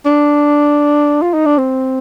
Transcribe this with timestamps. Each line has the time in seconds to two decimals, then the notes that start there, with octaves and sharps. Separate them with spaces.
0.05 D4
1.22 F4
1.34 D#4
1.46 D4
1.58 C4